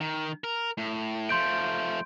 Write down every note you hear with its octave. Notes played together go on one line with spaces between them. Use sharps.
D#3
A#4
A2
F3 A3 C6 G6 D7